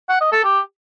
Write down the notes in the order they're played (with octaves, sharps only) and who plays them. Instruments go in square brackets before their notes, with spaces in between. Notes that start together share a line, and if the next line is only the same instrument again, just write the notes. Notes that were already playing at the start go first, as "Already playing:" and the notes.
[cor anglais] F#5
D#5
A4
G4